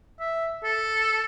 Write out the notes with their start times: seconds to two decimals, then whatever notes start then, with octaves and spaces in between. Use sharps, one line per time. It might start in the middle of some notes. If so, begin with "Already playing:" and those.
0.20 E5
0.64 A4